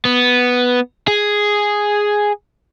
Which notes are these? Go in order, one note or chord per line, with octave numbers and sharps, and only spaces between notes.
B3
G#4